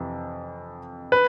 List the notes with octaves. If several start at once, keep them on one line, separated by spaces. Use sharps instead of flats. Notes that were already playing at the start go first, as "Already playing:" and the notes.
Already playing: F2 C3 E3
B4